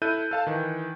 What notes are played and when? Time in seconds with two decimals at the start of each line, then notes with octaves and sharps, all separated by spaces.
0.02 E4 A4 F#6 G6 D#7
0.31 A4 F5 A5
0.47 D#3 E3